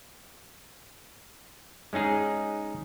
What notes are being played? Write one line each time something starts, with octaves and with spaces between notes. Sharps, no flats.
G#3 C#4 D#4 G#4